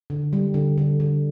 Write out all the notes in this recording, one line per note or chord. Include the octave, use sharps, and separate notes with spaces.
D3
G3
D3
D3
D3